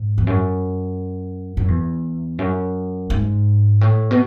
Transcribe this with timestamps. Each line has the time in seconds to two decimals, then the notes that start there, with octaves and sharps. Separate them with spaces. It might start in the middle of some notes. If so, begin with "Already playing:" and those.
Already playing: G#2
0.18 E2
0.27 F#2
1.57 F#2
1.68 E2
2.39 F#2
3.10 G#2
3.81 A2
4.11 B2